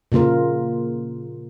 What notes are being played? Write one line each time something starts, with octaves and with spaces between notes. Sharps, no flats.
A#2 C#3 A#3 F4 A#4